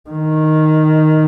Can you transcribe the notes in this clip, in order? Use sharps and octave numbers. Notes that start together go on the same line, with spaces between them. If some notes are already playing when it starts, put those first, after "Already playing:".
D#3